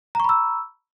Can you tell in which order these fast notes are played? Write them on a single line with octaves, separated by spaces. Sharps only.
A#5 C#6 B5 E6